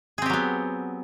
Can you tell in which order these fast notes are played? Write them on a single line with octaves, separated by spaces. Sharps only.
G#4 C4 G4 F#3 B3